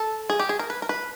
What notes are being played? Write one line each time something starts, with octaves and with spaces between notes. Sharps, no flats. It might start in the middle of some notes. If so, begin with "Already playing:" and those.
Already playing: A4
G#4
G4
G#4
A#4
B4
A#4
B4